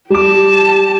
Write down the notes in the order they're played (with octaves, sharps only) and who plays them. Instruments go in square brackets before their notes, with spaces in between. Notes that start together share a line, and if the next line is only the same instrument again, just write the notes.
[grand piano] G3 D6 [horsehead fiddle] G4 A5